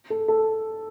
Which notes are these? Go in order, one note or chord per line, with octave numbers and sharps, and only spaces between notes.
A4
A4